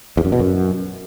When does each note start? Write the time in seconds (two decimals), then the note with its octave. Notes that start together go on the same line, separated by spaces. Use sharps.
0.17 E2
0.25 F#2
0.32 B2
0.40 F#2